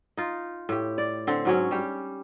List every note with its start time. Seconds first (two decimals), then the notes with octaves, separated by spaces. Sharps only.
0.17 D#4 F4
0.69 A2 G4
0.98 D5
1.27 D3 C4
1.45 G#2 F#3 C#4
1.71 G3 G4